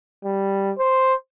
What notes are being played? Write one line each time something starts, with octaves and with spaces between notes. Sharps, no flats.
G3
C5